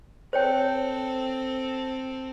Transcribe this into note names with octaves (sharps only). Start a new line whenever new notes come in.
C4 A4 C5 C#5 G5